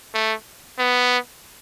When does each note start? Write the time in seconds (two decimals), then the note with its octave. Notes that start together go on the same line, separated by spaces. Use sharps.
0.14 A3
0.79 B3